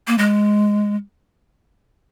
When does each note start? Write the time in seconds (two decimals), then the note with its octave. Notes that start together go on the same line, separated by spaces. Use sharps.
0.07 A#3
0.18 G#3